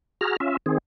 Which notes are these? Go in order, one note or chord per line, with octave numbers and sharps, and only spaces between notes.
F#4 G#4 A#5 F6
C#4 F4 E5
D#3 C4 G#4